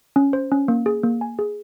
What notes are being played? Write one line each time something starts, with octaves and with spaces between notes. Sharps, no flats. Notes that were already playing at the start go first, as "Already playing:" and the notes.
C#4
C5
C#4
A#3
G#4
A#3
G#5
G#4